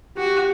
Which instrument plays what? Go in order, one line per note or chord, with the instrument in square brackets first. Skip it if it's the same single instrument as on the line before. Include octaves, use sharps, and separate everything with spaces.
[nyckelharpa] F#4 [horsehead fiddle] G4